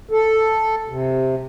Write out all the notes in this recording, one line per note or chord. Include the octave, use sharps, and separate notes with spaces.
A4
C3